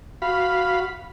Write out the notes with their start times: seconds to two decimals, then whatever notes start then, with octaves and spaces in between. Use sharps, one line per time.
0.22 F#4 F5 B5